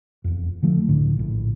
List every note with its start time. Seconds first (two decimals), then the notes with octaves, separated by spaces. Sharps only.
0.24 E1 F2
0.62 D3 F3 A3
0.89 C#2 A2 D3
1.17 A#1 A2